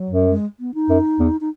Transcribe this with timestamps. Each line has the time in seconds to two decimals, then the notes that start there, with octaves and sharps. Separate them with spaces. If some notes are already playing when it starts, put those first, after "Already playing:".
Already playing: F#3
0.10 F#2
0.30 G#3
0.60 B3
0.74 D#4
0.89 F#2
1.19 E2
1.41 D#4